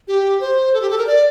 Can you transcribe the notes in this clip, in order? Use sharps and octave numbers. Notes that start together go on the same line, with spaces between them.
G4
C5
A4
G4
A4
A#4
D5